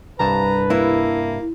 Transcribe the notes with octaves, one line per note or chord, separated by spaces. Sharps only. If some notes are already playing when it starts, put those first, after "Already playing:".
C2 G2 B4 A5 A#5
A#3 E4